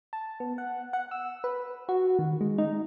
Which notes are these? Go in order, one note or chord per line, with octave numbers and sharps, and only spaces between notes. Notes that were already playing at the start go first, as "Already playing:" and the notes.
A5
B3
F#5
F#5
E6
B4
F#4
D#3
G#3
D#4